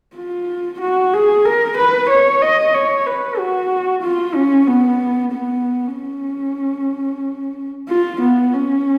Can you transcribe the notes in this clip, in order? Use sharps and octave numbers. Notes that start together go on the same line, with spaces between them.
F4
F#4
G#4
A#4
B4
C#5
D#5
C#5
B4
F#4
F4
C#4
B3
B3
C#4
F4
B3
C#4